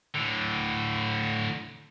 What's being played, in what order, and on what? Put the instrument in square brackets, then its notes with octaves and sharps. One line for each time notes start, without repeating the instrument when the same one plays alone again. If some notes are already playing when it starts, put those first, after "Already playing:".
[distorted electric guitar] A2 D3